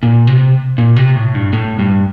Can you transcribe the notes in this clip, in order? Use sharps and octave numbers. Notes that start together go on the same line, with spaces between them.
A#2
C3
A#2
C3
A2
G2
A2
G2